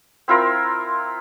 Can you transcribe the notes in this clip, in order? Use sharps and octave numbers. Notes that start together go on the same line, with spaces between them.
C4 E4 F4 A#4